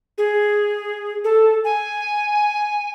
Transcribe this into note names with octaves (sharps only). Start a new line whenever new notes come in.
G#4
A4
G#5